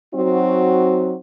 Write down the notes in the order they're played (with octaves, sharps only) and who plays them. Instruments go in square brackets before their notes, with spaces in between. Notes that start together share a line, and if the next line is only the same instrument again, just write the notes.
[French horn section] F#3 C4 D#4 F#4